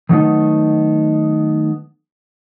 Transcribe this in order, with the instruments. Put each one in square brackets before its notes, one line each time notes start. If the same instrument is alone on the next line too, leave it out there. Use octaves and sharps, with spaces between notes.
[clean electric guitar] D#3 F#3 G3 A3 B3 D#4